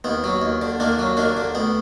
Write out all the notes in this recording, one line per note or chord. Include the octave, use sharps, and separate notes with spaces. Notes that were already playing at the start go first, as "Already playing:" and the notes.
D#2 B3
F#3
D#2
D3
D#2 A#3 D4
F#3
D#2 A#3 D4
D3
D2 B3